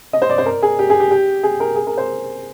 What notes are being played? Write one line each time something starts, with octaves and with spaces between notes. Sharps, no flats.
D#5
C5
D5
C5
A#4
G#4
G4
G#4
G4
G4
G#4
A#4
G#4
A#4
C5